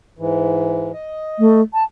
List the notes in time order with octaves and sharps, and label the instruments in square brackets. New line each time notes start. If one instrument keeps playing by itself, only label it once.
[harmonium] G#2 E3
D#5
[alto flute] A3
A5